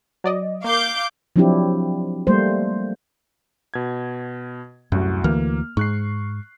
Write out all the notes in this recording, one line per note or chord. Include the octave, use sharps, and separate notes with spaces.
F#3 D5 D#5
A#3 F5 D6 G6
F3 F#3 C4 D4 E4 G4
G3 A3 A#3 C5
B2 G#6
C2 F#2 A2 F#4
D2 E3 A#3 F6
G#2 C#6 F#6 C7